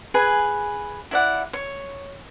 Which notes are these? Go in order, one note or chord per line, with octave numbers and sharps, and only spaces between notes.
G#4 B4 G#5
E4 D5 F#5
C#5